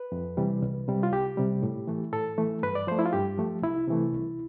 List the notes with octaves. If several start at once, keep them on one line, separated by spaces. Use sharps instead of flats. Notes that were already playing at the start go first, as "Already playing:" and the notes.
Already playing: B4
F2
C3 E3 G3
C2
C3 G3
F4
C2 G4
C3 G3
A2
E3 A3
A2 A4
E3 A3
G2 B4
D5
F3 A3 C5
E4
F4
G2 G4
F3 A3
C2 E4
C3 E3 A3
C2